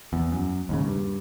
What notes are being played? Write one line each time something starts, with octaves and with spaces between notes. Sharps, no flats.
E2
F#2
D#2 G#2 C#3
G2